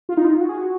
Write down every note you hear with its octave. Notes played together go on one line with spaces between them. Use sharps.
F4
D#4
F4
F#4
G#4
F#4